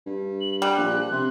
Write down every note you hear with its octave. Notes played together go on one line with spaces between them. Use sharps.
G2
F#7
G3 F#6
A#1
C3